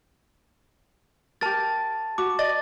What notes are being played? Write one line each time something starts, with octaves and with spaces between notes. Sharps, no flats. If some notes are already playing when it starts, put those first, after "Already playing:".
G4 A#4 A5 A6
F#4 D6
D5 D#5 A6